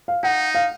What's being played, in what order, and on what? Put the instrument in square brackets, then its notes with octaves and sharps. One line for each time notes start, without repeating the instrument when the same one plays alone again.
[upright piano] F5
[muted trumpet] D#4 [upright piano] F#5
[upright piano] F5